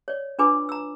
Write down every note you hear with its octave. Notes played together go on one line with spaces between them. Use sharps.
C#5 D5
D4 F4 B4 G#5 B5 D6
A#5 E6